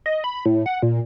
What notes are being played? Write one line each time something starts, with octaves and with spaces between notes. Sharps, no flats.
D#5
B5
A2
F#5
A#2